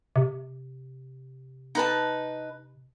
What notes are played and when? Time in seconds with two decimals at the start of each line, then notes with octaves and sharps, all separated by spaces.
0.16 C3
1.75 D#4 B4 A5